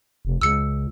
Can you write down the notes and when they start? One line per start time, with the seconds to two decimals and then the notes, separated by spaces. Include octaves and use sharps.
0.25 F1
0.41 C#2 E6 C#7